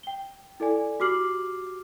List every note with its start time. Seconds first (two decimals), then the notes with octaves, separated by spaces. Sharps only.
0.03 G5 G7
0.60 E4 A4 D5 G#5
1.00 F#4 G4 D6 F6 C7 F#7